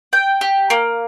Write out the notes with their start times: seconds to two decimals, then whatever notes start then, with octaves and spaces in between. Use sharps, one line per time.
0.13 G5
0.41 G4
0.70 A#3